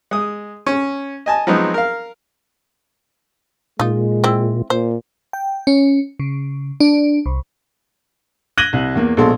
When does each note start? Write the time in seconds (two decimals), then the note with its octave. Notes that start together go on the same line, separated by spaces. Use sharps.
0.11 G#3 D#6
0.67 C#4
1.26 D#5 G#5 A5
1.47 F3 F#3 G#3 B3 C4 D#4
1.74 A#4 F5
3.79 A#2 G#3 D#4 F4
4.24 C4 E4
4.70 A#2 C5
5.33 G5
5.67 C#4
6.19 C#3
6.80 D4
7.26 C2
8.57 F#6 G#6 A#6 D#7 F#7 G7
8.73 C2
8.95 E2 A#3
9.17 A#1 B2 G#3 A4 C6